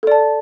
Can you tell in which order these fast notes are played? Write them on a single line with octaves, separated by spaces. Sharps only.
A4 D5 A5